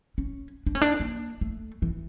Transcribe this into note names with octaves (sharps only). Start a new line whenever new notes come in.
C#4
D4
C#4
D4
A#3
A3
E3